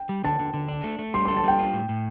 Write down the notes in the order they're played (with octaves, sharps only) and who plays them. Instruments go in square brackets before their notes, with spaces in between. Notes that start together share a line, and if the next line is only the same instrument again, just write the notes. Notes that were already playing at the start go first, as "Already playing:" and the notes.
Already playing: [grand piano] G5
[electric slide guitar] G3
[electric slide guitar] D3 [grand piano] A5
[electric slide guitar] D3
D3
D4
A3
A3
[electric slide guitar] G3 [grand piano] C6
[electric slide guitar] A4 [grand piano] C6
[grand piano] A5
[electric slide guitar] G3 [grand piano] G5
[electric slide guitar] F4
A2
A2